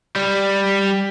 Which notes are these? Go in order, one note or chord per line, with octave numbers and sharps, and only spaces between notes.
G3